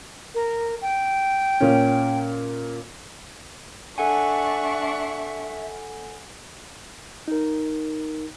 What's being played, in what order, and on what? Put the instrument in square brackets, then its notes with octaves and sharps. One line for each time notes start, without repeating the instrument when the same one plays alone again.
[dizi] A#4
G5
[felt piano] A#2 C#4
[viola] D4 C#6 [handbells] A4 F#5 G#5 [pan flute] E5
[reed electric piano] D#4 A#4